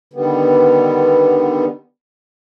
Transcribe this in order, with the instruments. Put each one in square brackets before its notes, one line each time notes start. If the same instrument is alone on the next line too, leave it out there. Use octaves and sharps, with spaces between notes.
[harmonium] D3 D#3 G3 B3